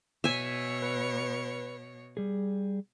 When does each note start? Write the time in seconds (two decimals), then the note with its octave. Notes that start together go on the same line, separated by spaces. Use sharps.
0.24 B2 C#5 E5 G#5
0.82 B4
2.17 G3 G#4